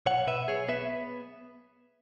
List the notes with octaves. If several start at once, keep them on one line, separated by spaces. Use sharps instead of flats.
B1 C#5 F#5
B2 B4 E5
B1 G#4 C#5
B3 B4 E5